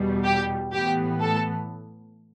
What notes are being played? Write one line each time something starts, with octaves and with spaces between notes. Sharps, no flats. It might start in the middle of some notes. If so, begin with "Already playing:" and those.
Already playing: E2 B2 G3
G4
A2 E3 B3 G4
A4